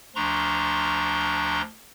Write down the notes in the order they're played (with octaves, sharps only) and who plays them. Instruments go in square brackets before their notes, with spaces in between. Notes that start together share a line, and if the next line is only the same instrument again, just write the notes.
[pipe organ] D2 F3 D4 A#5 C6 C#6